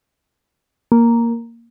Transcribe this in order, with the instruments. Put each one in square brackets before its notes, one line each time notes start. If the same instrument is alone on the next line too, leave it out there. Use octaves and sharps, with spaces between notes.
[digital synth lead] A#3